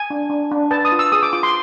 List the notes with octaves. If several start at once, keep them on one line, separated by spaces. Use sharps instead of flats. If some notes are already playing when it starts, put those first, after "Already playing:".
Already playing: G#5
D4
D4
D4
B4 A5
D#6
F4
E6
G#4 D#6
D6
F4 D6
C6